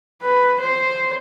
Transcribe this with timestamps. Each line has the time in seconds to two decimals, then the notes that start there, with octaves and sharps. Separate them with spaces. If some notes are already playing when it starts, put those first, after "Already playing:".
0.22 B4
0.60 C5